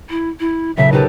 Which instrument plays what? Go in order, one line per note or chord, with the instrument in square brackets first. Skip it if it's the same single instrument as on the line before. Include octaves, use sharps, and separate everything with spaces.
[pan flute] E4
E4
[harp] B1 A#2 C#3 [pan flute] E5
[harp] D#4 G4 A4 [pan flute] B4